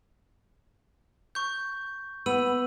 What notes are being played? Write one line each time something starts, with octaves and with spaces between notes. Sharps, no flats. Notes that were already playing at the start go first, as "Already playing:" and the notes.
C#6 G6
B3 E6 D#7 F#7